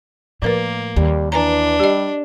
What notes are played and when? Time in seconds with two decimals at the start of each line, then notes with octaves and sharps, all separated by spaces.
0.42 A2 F3 A#3 A#4 B4
0.96 D#2 G3
1.32 E3 D4 B4 G#5 A#5
1.80 G3 G4 D#5